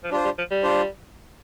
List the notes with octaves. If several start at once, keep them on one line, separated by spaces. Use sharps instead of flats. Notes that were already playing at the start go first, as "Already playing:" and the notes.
F3
G3 D4 F4 C5
G3
F3
G3
D4 F4 C5